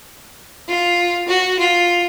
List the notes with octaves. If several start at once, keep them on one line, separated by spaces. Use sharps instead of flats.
F4
F#4
F4